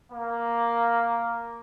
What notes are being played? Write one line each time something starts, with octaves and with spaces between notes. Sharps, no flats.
A#3